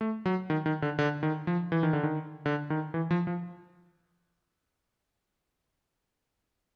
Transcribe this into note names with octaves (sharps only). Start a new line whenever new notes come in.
A3
F#3
D#3
D#3
D3
D3
D#3
F3
E3
D#3
D3
D#3
D3
D#3
E3
F3
F3